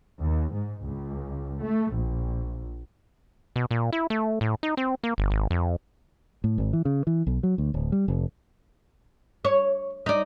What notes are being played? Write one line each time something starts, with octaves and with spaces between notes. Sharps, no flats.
D#2
G#2
C#2
A3
A#1
B2
A#2
E4
A3
A2
D#4
C4
A#3
G1
G#1
F2
A2
G#1
E3
C#3
E3
B1
F#3
D2
D1
G3
F1
C#5
D#4 D5